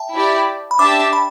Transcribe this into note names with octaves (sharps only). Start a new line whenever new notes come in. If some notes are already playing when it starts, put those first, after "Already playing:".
Already playing: E5 G5 A5
E4 G4 D5
B5
D4 G4 E5 A5 D6
B5